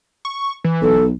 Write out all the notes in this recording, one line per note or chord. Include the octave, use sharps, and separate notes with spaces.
C#6
E3
B1 A4